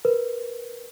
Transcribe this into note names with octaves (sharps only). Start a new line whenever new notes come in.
A#4 B4